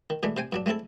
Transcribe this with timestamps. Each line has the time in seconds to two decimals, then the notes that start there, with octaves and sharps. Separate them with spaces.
0.10 D#3
0.23 B2 E3 G#3 A3 D4
0.37 C3 C5 G5 G#5
0.52 G2 F#3 D4
0.66 G#3 A3 C4 E4 A4